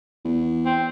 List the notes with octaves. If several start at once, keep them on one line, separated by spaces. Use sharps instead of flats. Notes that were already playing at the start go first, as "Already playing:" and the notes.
E2
C4